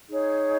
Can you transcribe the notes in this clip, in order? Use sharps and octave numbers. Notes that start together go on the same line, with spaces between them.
D#4 G#4 C#5